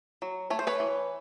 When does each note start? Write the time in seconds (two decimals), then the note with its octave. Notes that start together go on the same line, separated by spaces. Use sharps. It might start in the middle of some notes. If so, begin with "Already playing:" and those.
0.22 F#3
0.50 A3 C#5
0.59 C5
0.67 B4 C#5
0.80 E3